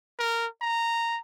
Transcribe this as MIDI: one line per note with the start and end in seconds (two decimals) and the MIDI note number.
0.19 0.46 70
0.62 1.19 82